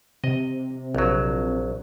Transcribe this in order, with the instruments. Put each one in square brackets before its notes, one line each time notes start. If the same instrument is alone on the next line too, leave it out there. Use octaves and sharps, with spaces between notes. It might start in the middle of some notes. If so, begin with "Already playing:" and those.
[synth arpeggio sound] C3 [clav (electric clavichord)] D#5
[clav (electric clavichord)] A#1 F#3